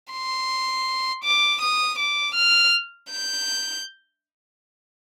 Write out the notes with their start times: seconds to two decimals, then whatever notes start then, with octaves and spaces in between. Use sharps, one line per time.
0.12 C6
1.24 D6
1.61 D#6
1.99 D6
2.35 F6
3.10 G6